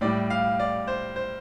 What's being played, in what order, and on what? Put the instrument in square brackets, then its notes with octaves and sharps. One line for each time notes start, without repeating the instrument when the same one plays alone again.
[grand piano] A2 G3 D5
F5
D5
C5
C5